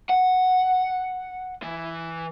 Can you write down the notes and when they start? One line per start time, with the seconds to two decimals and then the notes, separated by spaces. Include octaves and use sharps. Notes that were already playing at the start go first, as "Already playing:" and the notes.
0.09 F#5
1.63 E3